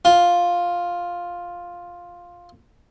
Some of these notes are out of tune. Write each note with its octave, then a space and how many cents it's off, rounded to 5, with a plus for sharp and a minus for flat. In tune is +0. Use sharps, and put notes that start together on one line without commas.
F4 +5